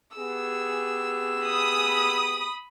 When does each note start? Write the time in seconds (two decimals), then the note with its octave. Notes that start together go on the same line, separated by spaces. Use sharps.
0.17 B3 G4 G#4 E6
1.45 B5 D#6